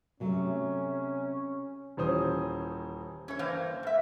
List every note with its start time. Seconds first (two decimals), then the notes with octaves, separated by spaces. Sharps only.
0.20 C3 F#3 A3 C#4
1.97 D#1 E3 C#4 C5 D#6
3.28 C#4 C#5
3.39 G2 E3 A#3 C5 F5
3.83 G#2 E5